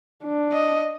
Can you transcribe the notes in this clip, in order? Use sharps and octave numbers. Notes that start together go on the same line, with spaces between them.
D4
D#5